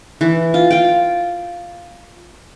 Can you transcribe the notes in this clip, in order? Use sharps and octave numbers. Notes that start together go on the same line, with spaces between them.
E3
F4
F4 G5